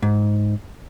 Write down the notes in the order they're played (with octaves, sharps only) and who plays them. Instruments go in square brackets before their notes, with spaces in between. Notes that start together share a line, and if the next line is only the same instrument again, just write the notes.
[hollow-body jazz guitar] G#2